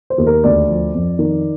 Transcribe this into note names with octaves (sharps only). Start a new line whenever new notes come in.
C5
D#2
A#4
D2 D5
F3
F2
D#3